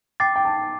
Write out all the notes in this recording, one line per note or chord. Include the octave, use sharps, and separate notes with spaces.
G5 D6 A6 C7
G5
A5